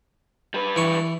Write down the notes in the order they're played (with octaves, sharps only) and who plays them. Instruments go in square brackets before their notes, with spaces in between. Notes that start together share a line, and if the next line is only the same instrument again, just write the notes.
[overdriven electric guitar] G3 B4
[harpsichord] E3 C#6